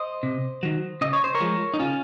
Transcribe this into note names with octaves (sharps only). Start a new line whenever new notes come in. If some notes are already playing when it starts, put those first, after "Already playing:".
Already playing: C5 D#5
C3
D#3 F#3
C#3 D#5
C#5
C5
A#4 C#5
F3 G#3
D#4
C#3 C#4 F4